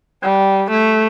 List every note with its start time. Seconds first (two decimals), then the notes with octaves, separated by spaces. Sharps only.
0.23 G3
0.70 A3